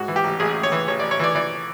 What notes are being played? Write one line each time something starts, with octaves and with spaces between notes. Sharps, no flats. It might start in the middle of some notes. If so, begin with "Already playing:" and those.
Already playing: G#2 F#4
E3
G4
A1
A1 G#4
A1
C#5
E3
A1 C#5
D5
A1
C#5
E3 D5
E3 D5